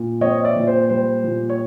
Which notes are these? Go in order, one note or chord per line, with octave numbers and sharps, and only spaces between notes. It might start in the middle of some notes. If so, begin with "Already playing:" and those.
Already playing: A#2
C4 C#5 D#5
D5 E5
A#2
C5
G3 C5
A#2
C#5